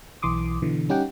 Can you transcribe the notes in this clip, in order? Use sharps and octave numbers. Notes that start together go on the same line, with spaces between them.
B1 E3 C6 D6 D#6
B2 D3 E3
G3 C#4 D#4 G4 F#5 G5